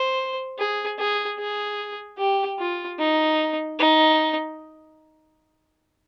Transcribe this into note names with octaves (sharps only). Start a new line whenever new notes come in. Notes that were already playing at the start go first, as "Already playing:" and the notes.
Already playing: C5
G#4
G#4
G#4
G4
F4
D#4
D#4